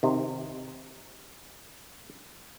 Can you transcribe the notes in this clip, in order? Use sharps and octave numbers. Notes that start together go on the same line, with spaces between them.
C3 D#3